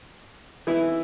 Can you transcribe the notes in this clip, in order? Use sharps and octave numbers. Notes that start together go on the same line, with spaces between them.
E3 E4